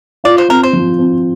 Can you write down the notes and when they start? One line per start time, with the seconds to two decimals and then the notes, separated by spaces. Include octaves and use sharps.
0.24 F4 D5
0.38 C5
0.49 C4 A#4
0.63 C5
0.73 F3
0.98 C4